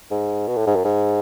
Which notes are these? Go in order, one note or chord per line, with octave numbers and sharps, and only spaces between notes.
G#2
B2
A2
G#2
F#2
G#2